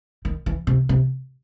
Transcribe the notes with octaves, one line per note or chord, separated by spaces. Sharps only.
D#3
E3
C3
C3